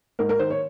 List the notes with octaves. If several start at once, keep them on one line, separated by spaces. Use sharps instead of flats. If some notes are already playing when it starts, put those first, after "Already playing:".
G#2 A#4
A#4
D#3 C5
C#5